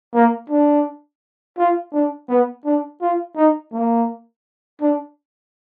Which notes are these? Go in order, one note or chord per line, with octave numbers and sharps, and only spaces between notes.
A#3
D4
F4
D4
B3
D4
F4
D#4
A#3
D4